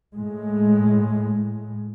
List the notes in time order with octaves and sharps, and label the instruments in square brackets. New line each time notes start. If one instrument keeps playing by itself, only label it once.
[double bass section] A2 G#3